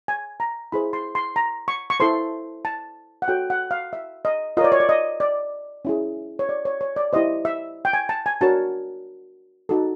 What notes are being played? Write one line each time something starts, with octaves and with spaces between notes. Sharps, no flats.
G#5
A#5
E4 G#4 C5 B5
C6
C6
A#5
C#6
C#6
E4 A4 C5 C6
A5
F#5
F#4 A4 C#5 G5
F#5
F5
E5
D#5
F4 A#4 C#5 D#5
D5
C#5
D5
D#5
D5
C#4 E4 G#4
C#5
D5
C#5
C#5
D5
E4 G4 C5 D#5
E5
G5
G#5
A5
G#5
D4 F#4 A#4 C#5 A5
D#4 F#4 A4